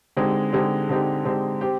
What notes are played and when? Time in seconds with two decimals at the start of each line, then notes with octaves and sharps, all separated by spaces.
0.17 D3 G#3 C4 D#4 G4
0.53 D3 G#3 C4 D#4 G4
0.89 D3 G#3 C4 D#4 G4
1.25 D3 G#3 C4 D#4 G4
1.61 C4 G4